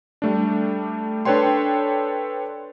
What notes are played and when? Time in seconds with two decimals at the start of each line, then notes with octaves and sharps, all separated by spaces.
0.22 G3 A3 D4
1.25 D4 A4 B4 C#5 G5 C6